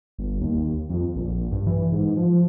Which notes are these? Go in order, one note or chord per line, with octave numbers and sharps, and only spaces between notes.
G1
D#2
F2
A#1
G2
E3
G#2
F3